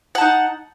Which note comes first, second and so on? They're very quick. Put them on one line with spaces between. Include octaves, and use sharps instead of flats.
F#5 A5 D#4